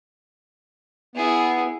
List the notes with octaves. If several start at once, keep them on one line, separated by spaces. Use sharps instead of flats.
B3 E4 G#4